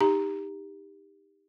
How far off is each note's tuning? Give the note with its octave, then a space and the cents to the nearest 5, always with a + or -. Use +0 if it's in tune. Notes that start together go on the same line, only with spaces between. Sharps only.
D#4 +0 G4 +15 A#5 +0